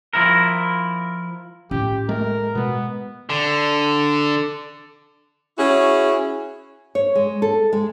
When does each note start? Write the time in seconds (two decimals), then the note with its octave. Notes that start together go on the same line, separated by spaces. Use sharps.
0.13 F3 E4 A#4
1.71 A2 C#4 F4 G4
2.09 G#3 A3 A#4
2.55 B2 G#3 B3
3.30 D3
5.58 C#4 E4 F#4 G#4
6.95 C#5
7.15 G#3
7.42 A4
7.73 G#3